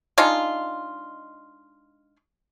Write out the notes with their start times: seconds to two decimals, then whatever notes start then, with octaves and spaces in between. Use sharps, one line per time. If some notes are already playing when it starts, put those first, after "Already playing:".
0.18 G#3 D4 D#4 F4